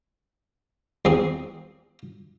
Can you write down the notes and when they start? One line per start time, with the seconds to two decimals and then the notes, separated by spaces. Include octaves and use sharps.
1.05 E2 C4 G#4